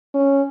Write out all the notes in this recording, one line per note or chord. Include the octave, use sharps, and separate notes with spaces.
C#4